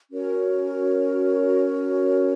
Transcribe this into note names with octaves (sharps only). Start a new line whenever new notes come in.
C#4 F#4 A#4 C#5